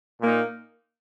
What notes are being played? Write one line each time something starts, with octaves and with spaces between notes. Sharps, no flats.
A#2 A#3 D#4